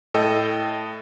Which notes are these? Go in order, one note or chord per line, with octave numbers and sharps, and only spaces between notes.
A2 A4 D#5 G5